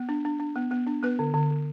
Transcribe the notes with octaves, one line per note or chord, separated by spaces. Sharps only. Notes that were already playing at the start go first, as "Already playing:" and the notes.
Already playing: B3
D4
D4
D4
B3
B3
D4
B3 B4
D3
D3
D3